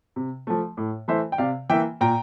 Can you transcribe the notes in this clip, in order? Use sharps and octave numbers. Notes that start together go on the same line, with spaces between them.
C3
F3 A3
A2
E3 A3 C5 E5
G5
C3 D5 F5
E3 A#3 E5 G5
A#2 G5 A#5